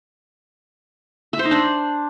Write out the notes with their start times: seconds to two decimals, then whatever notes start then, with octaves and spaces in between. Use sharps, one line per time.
1.33 E5
1.39 C5
1.45 D#4
1.51 D4